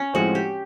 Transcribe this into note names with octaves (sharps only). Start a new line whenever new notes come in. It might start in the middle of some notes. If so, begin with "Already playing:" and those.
Already playing: C#4
A2 F3 G#3 C4 F#4
G4